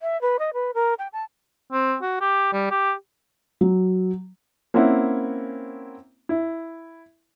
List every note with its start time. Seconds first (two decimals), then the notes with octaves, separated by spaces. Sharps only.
0.01 E5
0.22 B4
0.39 D#5
0.54 B4
0.74 A#4
0.99 G5
1.13 A5
1.72 C4
2.02 F#4
2.21 G4
2.53 G3
2.71 G4
3.61 F#3
4.74 A#3 C4 C#4 E4 F#5
6.29 E4